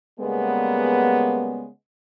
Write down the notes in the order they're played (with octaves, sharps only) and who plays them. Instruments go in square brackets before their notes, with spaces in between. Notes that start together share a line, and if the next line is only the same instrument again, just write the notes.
[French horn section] C#3 G3 G#3 A#3 B3